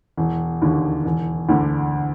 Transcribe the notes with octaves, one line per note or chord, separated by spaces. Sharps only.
E1
D#2 D3
E1
D2 D3